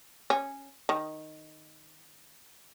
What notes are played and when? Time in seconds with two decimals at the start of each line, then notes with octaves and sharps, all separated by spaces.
0.30 C#4
0.89 D#3